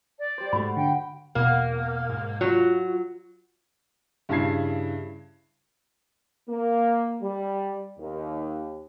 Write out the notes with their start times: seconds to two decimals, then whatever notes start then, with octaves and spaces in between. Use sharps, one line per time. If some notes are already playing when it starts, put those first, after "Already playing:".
0.19 D5
0.38 G3 C5
0.53 G#2 A3 F#4 F#5 B5
0.77 D3 G5
1.35 E2 B2 A#3 F#5
2.09 G#2
2.41 F#3 F4
4.29 G2 C#3 E4 A5 G#6 C7
6.49 A#3
7.22 G3
7.99 D#2